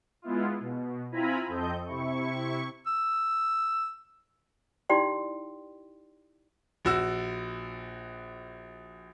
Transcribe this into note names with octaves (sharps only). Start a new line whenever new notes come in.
G#3 B3 E4 F4
B2
C4 E4 F4 G#5 A#5 B5
F2 C4 A4 D#5 G6
C3 E4 C#6
E6
D#4 E4 G4 D5 G5 C6
A#1 F#4 E6